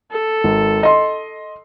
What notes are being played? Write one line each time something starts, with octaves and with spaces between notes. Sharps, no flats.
A4
G#1
D#5 C6